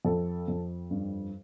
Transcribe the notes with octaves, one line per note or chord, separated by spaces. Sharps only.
F2 A4
F2
G2